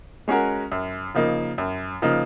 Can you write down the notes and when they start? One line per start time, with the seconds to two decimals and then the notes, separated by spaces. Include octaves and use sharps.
0.28 G#3 C#4 F#4 A#4
0.72 F#2
1.15 C#3 F3 A#3 D#4
1.58 F#2
2.02 C#3 F3 A#3 D#4